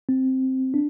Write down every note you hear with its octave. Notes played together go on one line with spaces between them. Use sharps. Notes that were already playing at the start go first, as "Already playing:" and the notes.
C4
D4